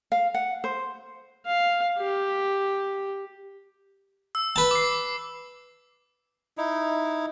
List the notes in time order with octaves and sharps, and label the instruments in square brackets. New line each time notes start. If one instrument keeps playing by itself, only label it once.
[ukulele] F5
F#5
C5
[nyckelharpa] F5
G4
[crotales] E6
[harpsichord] B4 A5
[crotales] D6 C7
[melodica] D#4 E4